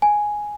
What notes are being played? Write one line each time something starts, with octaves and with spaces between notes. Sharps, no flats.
G#5